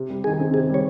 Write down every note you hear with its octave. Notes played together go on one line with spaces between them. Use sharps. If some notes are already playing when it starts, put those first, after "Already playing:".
Already playing: C3
G3
D#3 G#4
C4
C3 G#4
G3 C#5